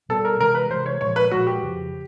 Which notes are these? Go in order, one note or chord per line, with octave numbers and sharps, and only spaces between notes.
B2 G3 B3 A4
A#4
C3 E3 G#3 A#4
B4
C3 E3 G#3 C5
C#5
A#2 F3 G#3 C#5
B4
A#2 F3 G#3 F#4
G4
F2 C#3 F3